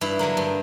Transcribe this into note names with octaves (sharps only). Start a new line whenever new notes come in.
G2 E4
D3 F#3 A#3
G2